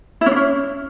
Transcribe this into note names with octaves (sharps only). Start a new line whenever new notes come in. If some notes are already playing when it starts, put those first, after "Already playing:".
E4
C#4
D4
C#4